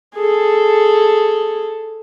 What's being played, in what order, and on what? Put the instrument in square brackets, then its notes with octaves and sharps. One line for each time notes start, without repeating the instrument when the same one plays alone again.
[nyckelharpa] G#4 A4